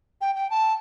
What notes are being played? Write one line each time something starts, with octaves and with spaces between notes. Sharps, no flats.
G5
G5
A5